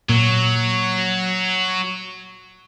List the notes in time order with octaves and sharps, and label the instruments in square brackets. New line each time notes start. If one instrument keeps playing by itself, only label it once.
[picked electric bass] A#2 [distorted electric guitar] F#3